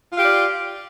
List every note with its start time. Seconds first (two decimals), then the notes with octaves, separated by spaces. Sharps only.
0.11 F4
0.15 F5
0.19 G4
0.23 D5